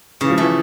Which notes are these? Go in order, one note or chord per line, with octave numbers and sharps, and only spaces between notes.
C#3 E3
F3
E3 A3